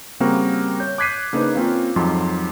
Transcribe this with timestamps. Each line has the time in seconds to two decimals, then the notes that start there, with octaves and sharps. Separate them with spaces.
0.20 C#3 G3 A#3 C4 F#4 A#4
0.80 C#5 G6
0.98 D6 F#6 G#6 B6 C7 D#7
1.33 C#3 A#3 D4 D#4 B4 C5
1.56 A#3 C4 C#4 F4
1.96 F2 G#2 F#3 C6